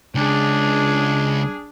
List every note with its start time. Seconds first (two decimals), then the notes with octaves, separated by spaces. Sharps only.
0.15 C#2 D4 G#4